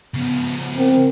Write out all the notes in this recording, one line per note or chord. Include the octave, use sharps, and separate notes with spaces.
C#3 F3 B3
C4 A#4